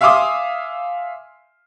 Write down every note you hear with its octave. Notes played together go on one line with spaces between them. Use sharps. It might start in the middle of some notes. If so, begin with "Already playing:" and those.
E5 F5 G#5 C6 D6 D#6